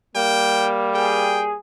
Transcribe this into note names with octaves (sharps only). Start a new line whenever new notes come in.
G3 A#3 G5
G#4 G5